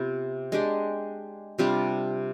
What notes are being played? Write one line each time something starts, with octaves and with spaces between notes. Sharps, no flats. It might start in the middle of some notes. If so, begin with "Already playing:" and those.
Already playing: C3 B3 F4
G#3 D4 G4
C3 G3 D4 F4